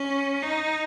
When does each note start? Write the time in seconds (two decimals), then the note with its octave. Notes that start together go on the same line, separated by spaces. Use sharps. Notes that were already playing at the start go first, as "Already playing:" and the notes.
Already playing: C#4
0.43 D#4